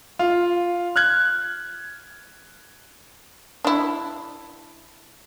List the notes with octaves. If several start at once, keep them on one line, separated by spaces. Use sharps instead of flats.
F4
F6 F#6 G#6
D4 E4